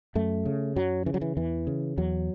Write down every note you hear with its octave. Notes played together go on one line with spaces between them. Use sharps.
F#2 A3
C#3
F#2 F#3
C#3 E3
F#3
E3
E2 E3
C#3
E2 F#3